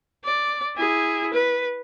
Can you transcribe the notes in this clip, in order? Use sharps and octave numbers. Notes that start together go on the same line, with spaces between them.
D5
E4 G#4
B4